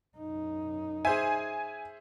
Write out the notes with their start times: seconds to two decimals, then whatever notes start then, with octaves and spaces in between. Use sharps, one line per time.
0.17 F#2 D#4
1.05 G#4 C5 E5 G#5